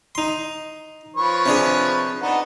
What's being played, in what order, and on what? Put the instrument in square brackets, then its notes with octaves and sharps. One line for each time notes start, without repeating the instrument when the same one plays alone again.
[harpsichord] D#4 C6
[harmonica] F3 B4 C#5
[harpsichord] C3 D4 G#4
[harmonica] B3 D4 D#4